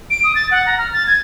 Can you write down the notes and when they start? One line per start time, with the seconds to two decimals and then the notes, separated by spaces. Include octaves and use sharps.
0.10 D7
0.24 D#6
0.35 A6
0.51 F#5
0.66 A#5
0.78 F6
0.93 A6
1.07 G#6